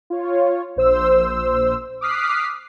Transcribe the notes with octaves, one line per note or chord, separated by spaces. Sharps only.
F4 C#5
A#1 C5 E6
D6 D#6 F6 F#6 B6 C7